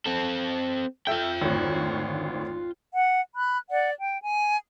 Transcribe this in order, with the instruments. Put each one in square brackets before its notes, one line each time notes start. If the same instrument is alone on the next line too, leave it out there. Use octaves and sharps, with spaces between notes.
[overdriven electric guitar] C4 A4
[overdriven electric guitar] F4 G5 [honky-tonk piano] A4 E5 G6
[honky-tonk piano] G#1 D2 C#5
[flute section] F#5
B5 F#6
D5 F#5
G5
G#5